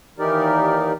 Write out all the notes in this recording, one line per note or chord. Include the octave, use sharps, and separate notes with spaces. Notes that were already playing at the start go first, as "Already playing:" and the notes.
D#2 E3 D#4 G4 A#4 D5